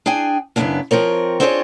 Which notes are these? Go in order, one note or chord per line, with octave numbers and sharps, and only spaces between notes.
D4 G#4 G5 G#5
F#2 C#3 A#3 B3 C#4 D4
F3 C4 A#4 C#5
C4 D4 F4 G#4 B4 C#5